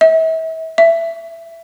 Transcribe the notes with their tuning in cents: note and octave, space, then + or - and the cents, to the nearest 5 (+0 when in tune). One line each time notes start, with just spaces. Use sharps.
E5 -35
E5 +15